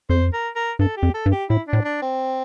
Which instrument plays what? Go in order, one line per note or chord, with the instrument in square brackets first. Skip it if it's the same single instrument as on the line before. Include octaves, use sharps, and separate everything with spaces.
[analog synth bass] F2 [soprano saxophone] C5
[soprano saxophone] A#4
A#4
[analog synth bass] G2 [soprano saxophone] A4
[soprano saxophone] G4
[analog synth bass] F2
[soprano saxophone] A4
[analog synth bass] G2
[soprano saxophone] G4
[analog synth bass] A2 [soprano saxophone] E4
[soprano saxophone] D4
[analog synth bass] A2
[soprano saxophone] D4
C4